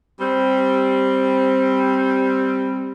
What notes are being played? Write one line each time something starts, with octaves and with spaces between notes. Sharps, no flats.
G3 C4